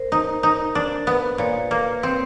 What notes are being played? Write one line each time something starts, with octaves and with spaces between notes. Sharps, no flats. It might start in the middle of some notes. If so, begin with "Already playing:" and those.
Already playing: A#4 C5
D#4
D#4
D4
B3
A#2 B4 C#5
A#3
C4 B4 C#5